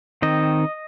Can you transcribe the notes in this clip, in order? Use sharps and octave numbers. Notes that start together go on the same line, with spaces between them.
D#3 C4 D#5